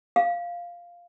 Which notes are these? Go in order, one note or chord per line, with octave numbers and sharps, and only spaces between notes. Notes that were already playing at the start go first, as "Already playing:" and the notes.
F5